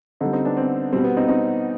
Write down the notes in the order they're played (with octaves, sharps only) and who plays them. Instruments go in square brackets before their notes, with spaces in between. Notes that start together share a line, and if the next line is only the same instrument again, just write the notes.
[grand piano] D3 G3 C4 D#4
C4 D#4
B3 D4
C4
B2 G3 C4
B3
C4 D#4
C4 D#4